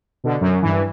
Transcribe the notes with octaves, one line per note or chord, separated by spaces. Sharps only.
B2 D3
F#2
G2 E3